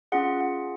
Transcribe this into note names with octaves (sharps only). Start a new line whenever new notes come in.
C#4 F4 G#4 F#5
F#5